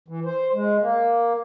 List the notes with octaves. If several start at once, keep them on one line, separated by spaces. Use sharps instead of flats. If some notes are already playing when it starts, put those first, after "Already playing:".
E3
C5
G#3
A#3